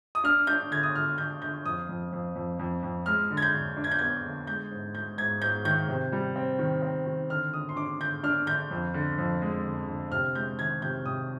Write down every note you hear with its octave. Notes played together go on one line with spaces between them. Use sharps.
D#6
D4 F6
D4 G6
D3 G#6
D#6
D3 F6
D3 G6
D3 G6
F2 D#6
F2
F2
F2
F2
F2
G#3 F6
D3
G#6
G6
D3
D4
G#6
G6
B3 G#6
D3
G#3 G6
G#2
G#3 G6
G#2 G#6
G#2 G6
D#3 G6
C3
G3
C4
D#3
C4
D#3
D3 F6
D3 D#6
C6
D4 D6
D3 G6
D4 F6
D3 G6
F2
D3
F2
G#3
D3
D3
C3 F6
G#3 G6
D#3 G#6
C3 G6
C3 D#6